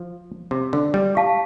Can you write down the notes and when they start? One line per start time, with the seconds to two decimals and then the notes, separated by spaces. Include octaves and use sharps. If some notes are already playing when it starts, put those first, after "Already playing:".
Already playing: F3
0.51 C3
0.73 D3
0.94 G3
1.15 G4 F5 A5